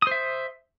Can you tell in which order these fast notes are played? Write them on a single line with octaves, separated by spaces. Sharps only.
D#6 C5 E5